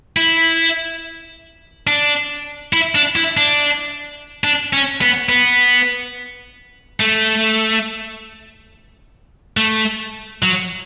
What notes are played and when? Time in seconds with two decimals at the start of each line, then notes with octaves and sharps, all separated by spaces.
0.17 E4
1.87 D4
2.73 E4
2.95 D4
3.16 E4
3.37 D4
4.44 D4
4.73 C#4
5.02 B3
5.29 B3
7.00 A3
9.57 A3
10.43 F#3